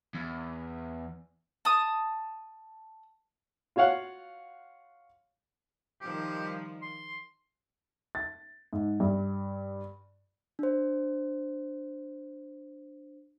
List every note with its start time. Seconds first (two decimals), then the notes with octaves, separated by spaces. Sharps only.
0.15 E2
1.65 A5 D#6
3.76 F4 F#4 C#5 F5 F#5
6.01 D#3 F3 G3 G4
6.82 C6
8.15 A6
8.73 G#2
9.00 G2
10.59 D4 C5